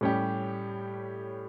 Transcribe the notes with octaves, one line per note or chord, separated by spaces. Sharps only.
A2 G3 C#4 G4